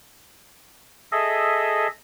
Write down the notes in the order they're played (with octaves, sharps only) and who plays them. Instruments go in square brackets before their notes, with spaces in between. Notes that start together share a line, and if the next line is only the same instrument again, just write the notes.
[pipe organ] G#4 A4 D#5 E5